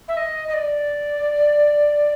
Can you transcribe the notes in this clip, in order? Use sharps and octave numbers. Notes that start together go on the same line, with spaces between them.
E5
D#5
D#5
D5